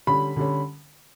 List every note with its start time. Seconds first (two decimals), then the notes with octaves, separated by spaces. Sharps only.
0.07 D3 G3 C#4 B5
0.36 D3 G3 C#4